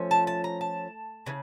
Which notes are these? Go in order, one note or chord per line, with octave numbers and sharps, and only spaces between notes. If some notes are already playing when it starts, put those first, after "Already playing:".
Already playing: F3 A3 C#4
A5
A5
A#5
A5
C#3 E3